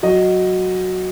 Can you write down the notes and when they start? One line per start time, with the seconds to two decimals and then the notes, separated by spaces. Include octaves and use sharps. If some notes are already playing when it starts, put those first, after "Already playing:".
0.03 F#3 D#5